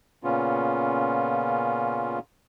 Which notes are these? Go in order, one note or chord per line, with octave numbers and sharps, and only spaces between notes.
A#2 C#3 B3 C#4 F4